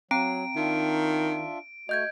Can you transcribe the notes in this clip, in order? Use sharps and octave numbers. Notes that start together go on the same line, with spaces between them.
F#3 C4 G5 A#5 D7
D#3 D4 F4 E5
A3 F#4 D#5 G6 G#6